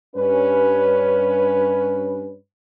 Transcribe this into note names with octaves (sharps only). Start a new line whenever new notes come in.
G2 C#4 B4